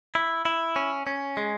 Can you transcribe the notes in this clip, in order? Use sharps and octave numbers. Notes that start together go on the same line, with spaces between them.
E4
E4
C#4
C#4
G#3